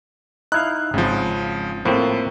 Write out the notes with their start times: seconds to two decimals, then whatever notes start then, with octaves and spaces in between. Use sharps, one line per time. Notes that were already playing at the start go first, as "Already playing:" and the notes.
0.52 D#4 E4 F5 F#6
0.94 G#1 C#3 F3
1.85 A2 F3 A#3 C4